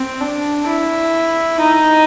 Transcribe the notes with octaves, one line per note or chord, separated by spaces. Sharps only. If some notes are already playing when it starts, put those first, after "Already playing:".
Already playing: C4
D4
E4
D#4